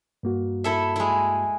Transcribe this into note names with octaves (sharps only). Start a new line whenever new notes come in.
G2 A#3 F#4
E4 A4 E5
G#3 E4